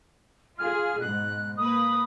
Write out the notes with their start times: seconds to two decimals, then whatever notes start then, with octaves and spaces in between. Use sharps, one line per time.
0.58 F4 G#4 F6
1.00 G#2 B2 F#6
1.57 A#3 B4 D#6